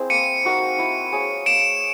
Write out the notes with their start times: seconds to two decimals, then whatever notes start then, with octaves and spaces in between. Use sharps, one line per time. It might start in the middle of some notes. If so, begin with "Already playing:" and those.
Already playing: C4 E4 G#4
0.10 A#3 C#7 D#7
0.45 D#4 F#4 A#4
0.78 E4
1.12 G#4 C#5 F5
1.46 A#3 D7 E7